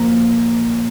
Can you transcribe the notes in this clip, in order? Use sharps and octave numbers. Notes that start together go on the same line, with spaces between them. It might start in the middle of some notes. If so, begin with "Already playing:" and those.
Already playing: A#2 F3 A#3 A#5